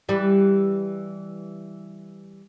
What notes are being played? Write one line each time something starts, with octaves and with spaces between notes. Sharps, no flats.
E3 G3